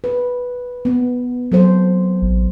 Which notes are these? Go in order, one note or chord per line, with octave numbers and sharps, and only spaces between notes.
B4
B3
F#3 A4 C5
A1